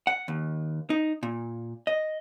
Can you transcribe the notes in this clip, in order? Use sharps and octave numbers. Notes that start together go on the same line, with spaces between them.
F#5
D#2
D#4
A#2
D#5